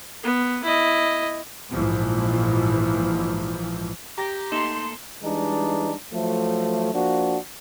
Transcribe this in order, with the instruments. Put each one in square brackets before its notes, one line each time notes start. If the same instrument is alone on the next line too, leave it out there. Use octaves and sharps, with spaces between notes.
[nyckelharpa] B3
E4 D#5
[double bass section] A#1 G#2 E3 F3
[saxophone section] G4 [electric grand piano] A#5 A#6
[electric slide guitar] A3 A#3 A4 [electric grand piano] D#4 [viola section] C6
[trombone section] E3 G3 G#3 D4 D#4
F3 F#3 A3
F3 A#3 D4 F#4